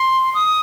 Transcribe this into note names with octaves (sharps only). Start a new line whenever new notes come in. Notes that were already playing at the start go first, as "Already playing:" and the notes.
Already playing: C6
D#6